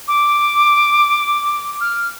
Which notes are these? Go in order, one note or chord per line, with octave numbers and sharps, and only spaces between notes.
D6
F6